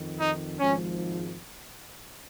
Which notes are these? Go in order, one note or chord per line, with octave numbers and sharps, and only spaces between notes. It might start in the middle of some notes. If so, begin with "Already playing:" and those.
Already playing: F2 D#3
D#4
G#1 G#2 F3 C#4